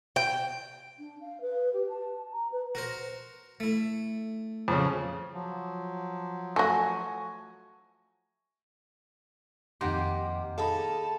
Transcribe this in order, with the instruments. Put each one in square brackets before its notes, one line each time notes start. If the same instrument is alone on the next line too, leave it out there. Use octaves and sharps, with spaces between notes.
[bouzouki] G5
[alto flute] D4
F5
B4
G4
A5
A#5
B4
[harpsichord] F#4 A#4 C5
A3 E4
[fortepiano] F2 C#3
[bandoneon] F3 F#3
[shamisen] A3 F#4 [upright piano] G#5 C#6 A#6
[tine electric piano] F2 F#5 C6 [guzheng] D#3 A#3 G4
[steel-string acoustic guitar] D#4 G#4 A4 [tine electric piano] F5 B5 [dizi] A5